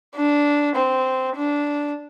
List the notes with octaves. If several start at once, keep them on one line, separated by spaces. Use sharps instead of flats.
D4
C4
D4